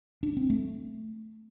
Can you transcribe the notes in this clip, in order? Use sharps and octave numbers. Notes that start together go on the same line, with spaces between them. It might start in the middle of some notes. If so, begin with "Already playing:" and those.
D4
C4
A3